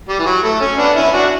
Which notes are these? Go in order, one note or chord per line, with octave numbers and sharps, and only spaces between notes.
G3
E3
F#3
A3
C#4
B3 D4
C#4 E4
D4 F#4